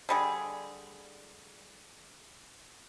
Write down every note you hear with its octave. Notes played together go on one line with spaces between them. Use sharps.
D3 G3 G#4